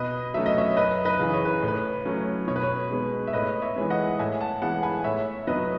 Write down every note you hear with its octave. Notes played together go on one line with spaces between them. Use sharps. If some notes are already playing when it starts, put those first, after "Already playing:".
Already playing: B2 B4 D#5
F#3 A3 C#4 E5
D#5
C#5 E5
F#2 B4 D#5
B4 D#5
C#3 E3
C#5
B4
A2
B4
F#3 A3 C#4
B2 C#5
B4
C#5
G#3 B3
E5
A2 B4 D#5
C#5 E5
E3 G#3 B3
D#5 F#5
A2 E5 G#5
F#5 A5
E3 G#3 B3 F#5 A5
G#5 B5
A2 C#5 E5
F#3 B3 B4 D#5